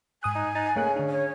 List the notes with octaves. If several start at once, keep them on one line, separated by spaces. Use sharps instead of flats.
G#2 G#5 D#6 F#6
D#4
D#4 F#6 A6
C#3 A3 A#3 F#6
D3 D4
C#5